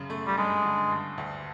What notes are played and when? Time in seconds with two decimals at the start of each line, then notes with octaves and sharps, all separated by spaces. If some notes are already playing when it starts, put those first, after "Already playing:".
Already playing: F#2 C#3
0.10 A3
0.27 G3
0.37 G2 G#3
0.65 D3
0.91 G2
1.18 D2